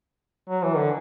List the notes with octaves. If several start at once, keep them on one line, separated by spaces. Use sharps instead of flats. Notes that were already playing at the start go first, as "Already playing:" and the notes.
F#3
E3
D3